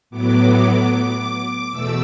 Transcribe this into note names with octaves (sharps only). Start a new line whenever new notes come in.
A2 F#3 B3 D6
D6
E2 B2 A3 E6